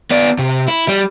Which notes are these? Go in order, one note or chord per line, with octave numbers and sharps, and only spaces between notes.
B3 D5
C3
E4
G3